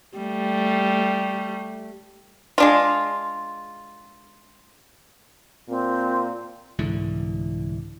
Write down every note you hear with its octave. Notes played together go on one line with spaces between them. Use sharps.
G3 A3
G#3 D4 F4
A#2 C4
C2 G#2 D3 E3